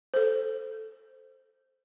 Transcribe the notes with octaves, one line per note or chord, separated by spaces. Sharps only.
A4 C5